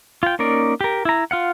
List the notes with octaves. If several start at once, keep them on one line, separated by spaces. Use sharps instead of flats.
F4 G5
A#3 C#4 D#4 A#4 D5
G4 A#4
E4 A#5
F4 F5 F#5